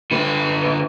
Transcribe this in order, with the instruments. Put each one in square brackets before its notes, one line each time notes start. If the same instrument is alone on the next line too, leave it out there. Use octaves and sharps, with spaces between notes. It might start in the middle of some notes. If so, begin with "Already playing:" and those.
[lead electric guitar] D3 B4